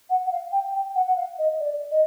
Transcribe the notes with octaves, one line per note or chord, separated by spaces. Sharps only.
F#5
F#5
F5
G5
G5
F#5
F#5
F5
D#5
D5
D#5